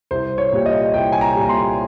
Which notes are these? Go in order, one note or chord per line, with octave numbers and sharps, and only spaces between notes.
C2 C5
C#5
A#2 G3
D#5
C2 G5
G#5
A#5
A#2 G3
C6